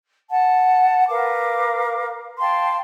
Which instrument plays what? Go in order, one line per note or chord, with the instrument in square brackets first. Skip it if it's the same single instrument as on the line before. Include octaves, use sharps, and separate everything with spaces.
[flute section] F#5 A5
A#4 B4 F5 D6
F5 G5 A5 C6